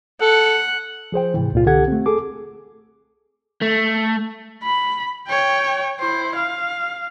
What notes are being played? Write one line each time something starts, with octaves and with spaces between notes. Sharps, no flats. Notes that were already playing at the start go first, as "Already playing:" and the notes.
A4 F#5
F3 G#4 C5 G5
G#2 C3 E3
C#2 A#2 F4
C2 D3 G4 A4 F#5 G#6
A3 C4
G#4 A4 D6
A3
B5
C#5 G5
E4 C5
F5